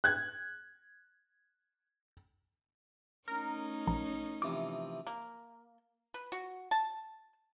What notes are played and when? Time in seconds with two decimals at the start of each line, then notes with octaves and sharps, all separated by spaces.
0.04 F#6 G#6
3.28 A3 C#4 D#4 A#4
3.87 A#1 A#5
4.42 C3 E3 F3 D6
5.07 A#3
6.14 B4
6.32 F#4
6.71 A5